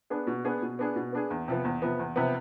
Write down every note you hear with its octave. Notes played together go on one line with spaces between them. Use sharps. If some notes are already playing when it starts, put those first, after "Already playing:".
B3 D4 G#4
B2
B3 D4 G#4
B2
B3 D4 G#4
B2
B3 D4 G#4
E2
C3 F3 B3
E2
C3 F3 B3
E2
C3 F3 B3